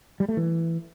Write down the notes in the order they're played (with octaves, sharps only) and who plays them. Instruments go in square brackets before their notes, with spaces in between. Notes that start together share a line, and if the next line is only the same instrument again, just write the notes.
[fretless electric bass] G3
A3
E3